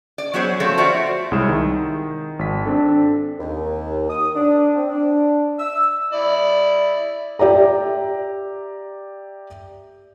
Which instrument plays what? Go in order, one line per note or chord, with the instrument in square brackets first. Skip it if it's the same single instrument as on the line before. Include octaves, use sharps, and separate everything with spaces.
[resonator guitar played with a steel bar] D5
F#3 B3 F#4 G#4 C5 C#5
F3 G3 A3 C4 A4 C#5
F4 F#4 C5 D5 E5 F#5
[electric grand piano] C2 G#3 E4 C#5 D#6 E7
D#3
G#1 B6
C4 D4 A4
[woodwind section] D#2
D#6
D4
C4
D4
E6
[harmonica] E4 D5
[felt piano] G4 D5 E5 A#5